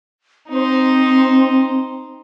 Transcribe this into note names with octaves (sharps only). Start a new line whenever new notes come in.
C4 D#4 C5